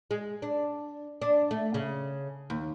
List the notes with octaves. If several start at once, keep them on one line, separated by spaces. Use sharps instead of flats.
G#3
D4
D4
A3
C#3
D#2